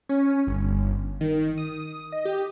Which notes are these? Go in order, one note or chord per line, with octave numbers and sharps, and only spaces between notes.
C#4
G1
D#3
D#6
D#5
G4